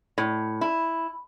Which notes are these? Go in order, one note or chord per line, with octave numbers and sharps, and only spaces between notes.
A2
E4